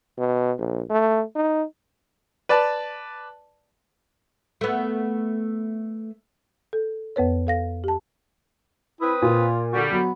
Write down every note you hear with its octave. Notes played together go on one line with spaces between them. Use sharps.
B2
A#1
A3
D#4
B4 D5 A5
A3 B3
A4
F2 B3 B4 C#5
A4 F5 A#6
G4 A5
C4 E4 B4 D#6
A#2 F4
D3 G3 F#4
F#3 B3